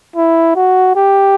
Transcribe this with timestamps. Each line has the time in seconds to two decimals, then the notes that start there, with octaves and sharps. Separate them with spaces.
0.16 E4
0.56 F#4
0.96 G4